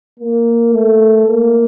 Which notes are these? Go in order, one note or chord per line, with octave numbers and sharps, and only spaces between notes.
A#3
A3
A#3